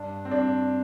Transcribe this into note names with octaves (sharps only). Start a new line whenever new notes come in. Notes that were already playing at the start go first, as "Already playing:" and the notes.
Already playing: G2 D4
C4
G2 D4